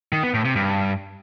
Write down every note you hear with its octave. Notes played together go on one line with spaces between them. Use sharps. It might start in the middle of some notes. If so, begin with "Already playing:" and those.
D#3
B3
A2
C3
G2